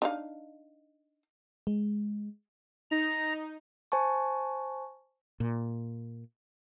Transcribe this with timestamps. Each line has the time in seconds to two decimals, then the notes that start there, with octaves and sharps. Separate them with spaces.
0.02 D4 D#4 F5
1.67 G#3
2.91 D#4 A#5
3.92 C5 G#5 A5 C#6
5.40 A#2